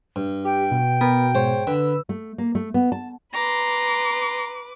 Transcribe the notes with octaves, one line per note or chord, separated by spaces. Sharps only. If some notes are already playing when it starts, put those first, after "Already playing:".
G2
G4 G5
B2
B3 A#4
G#2 C5 C#5
D3 B4 E6
A3
A#3
A3
B3
A5
B4 A#5 C6 D6